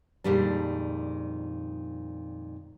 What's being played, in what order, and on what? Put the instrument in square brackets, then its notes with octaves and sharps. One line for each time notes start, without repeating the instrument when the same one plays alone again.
[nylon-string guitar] F2 A#2 D#3 G3 G#3 D4